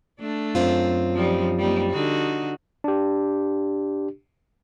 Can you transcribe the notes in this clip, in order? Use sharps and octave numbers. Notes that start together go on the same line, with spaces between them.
A3 D4
F#2 C4 F4
F3 G3 D#4
G3 A#3 D#4
D3 D#4 F#4
D4 G4